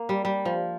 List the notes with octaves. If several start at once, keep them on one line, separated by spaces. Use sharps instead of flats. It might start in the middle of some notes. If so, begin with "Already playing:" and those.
Already playing: A#3
G3
G3
F3